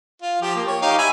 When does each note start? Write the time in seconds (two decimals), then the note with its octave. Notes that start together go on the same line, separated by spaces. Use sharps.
0.22 F4
0.42 F3 G4
0.56 A#3
0.67 C#5
0.82 D#4 G4 F5
0.98 E5 G#5 B5